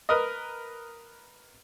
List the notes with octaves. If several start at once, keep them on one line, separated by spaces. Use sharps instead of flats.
A#4 B4 D#5